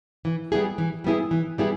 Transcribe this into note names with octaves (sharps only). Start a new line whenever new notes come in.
E3
G3 B3 E4 G#4
E3
G3 B3 E4 G#4
E3
G3 B3 E4 G#4